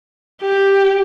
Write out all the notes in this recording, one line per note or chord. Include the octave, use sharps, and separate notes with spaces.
G4